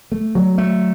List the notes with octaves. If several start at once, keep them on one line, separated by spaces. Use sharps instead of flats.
A3
F#3
A3